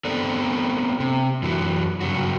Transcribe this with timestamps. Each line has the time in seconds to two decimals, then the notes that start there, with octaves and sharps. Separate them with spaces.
0.05 A3 B3 C4 D4 A4 D5
1.00 C3
1.42 F#2 E3 F#3
2.01 G2 C#3 F#3 F#4